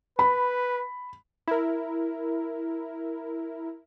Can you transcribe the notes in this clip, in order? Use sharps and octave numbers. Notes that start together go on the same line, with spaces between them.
B4 B5
E4 A#4